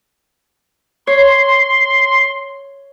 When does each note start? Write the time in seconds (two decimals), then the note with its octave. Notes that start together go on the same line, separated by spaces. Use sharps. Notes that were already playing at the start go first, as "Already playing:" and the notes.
1.07 C#5 C6